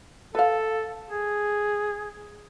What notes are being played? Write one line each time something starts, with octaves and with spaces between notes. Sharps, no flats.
A4 B4 F5
G#4